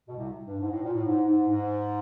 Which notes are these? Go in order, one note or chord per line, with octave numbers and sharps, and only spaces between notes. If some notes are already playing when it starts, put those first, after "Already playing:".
B2
C2 C3
G2
G#2
A2
A#2
A2
G#2
G#2
G#2